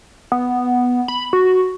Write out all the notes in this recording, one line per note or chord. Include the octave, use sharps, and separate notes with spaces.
B3
B5
F#4